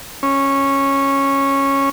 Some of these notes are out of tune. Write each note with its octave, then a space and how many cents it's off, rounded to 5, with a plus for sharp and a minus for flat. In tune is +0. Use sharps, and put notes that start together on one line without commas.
C#4 -10